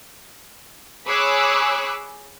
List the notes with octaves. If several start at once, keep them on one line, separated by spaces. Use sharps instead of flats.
G#4 C#5 B5 D6 E6 F#6